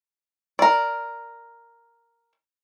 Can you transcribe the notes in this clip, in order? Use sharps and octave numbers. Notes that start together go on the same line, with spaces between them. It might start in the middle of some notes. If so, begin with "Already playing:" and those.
A#4 D5